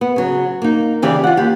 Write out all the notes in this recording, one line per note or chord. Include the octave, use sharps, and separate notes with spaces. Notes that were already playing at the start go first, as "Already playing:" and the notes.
B3
C#3 F#3
A#3 D#4
C#3 E3 G4 D5
F4 F#5
D#2 G4